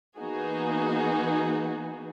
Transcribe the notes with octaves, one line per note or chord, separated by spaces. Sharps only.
E3 A#3 B3 D#4 F#4 G#4